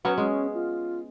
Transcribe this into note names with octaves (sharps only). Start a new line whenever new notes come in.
F#3 B3 C#4 B4
G#3 C#4
F4